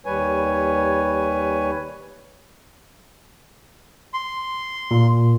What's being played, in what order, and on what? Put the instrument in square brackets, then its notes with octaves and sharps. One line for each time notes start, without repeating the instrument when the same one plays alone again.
[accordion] D#2 G3 B4 C#5 G#5
[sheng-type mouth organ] C6
[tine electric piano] A#2